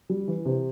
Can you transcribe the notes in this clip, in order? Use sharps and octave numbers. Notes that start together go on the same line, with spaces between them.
G3
E3
C3